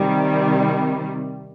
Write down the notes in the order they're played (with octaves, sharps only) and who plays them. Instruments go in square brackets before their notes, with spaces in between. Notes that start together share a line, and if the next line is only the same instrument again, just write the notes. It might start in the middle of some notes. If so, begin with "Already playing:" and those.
Already playing: [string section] C3 D#3 G3